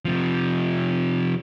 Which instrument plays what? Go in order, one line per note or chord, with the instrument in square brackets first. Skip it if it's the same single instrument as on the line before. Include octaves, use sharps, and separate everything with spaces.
[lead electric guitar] C3 F3